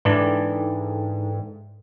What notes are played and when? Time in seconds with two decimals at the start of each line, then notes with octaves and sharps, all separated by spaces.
0.05 G#2 E3 D4 D#4 A4 D5 G5